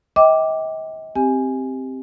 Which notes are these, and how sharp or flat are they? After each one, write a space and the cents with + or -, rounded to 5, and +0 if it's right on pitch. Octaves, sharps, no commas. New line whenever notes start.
D#5 +40 G5 +0 D6 +0
C4 +0 G4 +0 G#5 +0